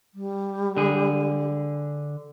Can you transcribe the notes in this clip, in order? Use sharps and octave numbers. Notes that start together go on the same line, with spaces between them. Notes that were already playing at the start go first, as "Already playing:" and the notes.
G3
D3 G#4